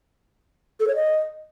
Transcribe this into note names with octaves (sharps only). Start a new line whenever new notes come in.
A4
C#5
D#5